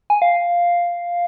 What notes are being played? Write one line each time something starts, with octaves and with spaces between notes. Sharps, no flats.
G#5
F5